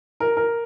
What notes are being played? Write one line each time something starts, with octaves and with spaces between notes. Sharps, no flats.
A#4
A#4